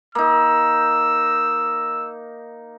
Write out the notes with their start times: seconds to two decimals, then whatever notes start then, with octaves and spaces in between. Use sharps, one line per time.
0.15 A#3 D#4 E6